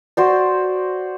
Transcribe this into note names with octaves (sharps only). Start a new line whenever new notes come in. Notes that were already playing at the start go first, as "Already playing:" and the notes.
F#4 C5 D5